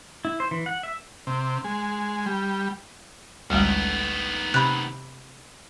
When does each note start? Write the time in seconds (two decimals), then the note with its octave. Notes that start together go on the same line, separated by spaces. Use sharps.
0.25 E4
0.40 C5
0.51 E3
0.66 F#5
0.83 E5
1.27 C3
1.64 G#3
2.26 G3
3.50 A1 D2 D#3 G3 G#3 B3
4.54 C3 B5 F#6